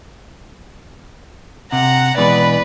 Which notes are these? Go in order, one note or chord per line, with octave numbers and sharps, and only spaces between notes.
C3 F#5 A#5
B2 E3 G#3 B4 D5